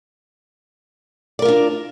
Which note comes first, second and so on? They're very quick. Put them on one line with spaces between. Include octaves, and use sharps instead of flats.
D5 A#4 F4 D4